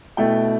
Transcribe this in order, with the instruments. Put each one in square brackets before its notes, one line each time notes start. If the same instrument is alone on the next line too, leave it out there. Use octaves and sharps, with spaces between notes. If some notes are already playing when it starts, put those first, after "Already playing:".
[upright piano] B2 A3 E4 G5